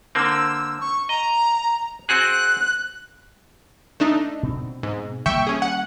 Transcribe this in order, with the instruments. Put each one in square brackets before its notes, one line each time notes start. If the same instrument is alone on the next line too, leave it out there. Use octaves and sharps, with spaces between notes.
[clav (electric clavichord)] D3 A#3 C4 [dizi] E6
[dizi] C#6
[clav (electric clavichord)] D#5 [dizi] A#5
[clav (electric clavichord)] C4 F#4 G#4 [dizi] F#6
[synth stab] A3 D4 D#4
[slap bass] B2 C4
[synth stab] G#2
[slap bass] D#3 G3 A#3 [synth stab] E5 G5 C#6
[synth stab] C#4 G#4
F#5